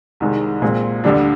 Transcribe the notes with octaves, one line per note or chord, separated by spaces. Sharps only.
C2 C3 D#3 G#3
A#2 G#3 C4
D2 D3 G3 D4